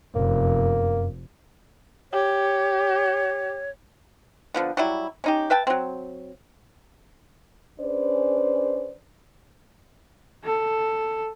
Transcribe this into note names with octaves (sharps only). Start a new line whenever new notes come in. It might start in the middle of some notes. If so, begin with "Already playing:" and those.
F1 F#2 A#3
G4 C#5
D3 F3 B3
F#3 G3 E4
C#4 D#4 G4
B4 E5 G5 A5
F#3 C4
C#4 D4 G#4 B4 C5 D5
A4